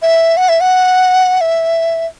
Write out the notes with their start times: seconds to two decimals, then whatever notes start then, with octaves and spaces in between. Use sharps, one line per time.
0.02 E5
0.37 F#5
0.49 E5
0.61 F#5
1.41 E5